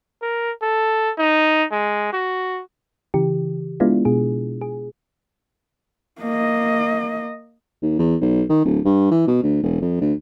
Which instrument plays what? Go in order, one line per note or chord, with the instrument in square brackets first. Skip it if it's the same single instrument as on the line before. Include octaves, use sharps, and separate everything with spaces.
[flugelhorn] A#4
A4
D#4
G#3
F#4
[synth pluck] C#3 E3 G4
G#3 B3 D4 E4 F4
B2 G#4
G#4
[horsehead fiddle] A#3 D#5
[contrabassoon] D#2
E2
B1
D#3
D1
G2
E3
B2
D2
E1
F2
D2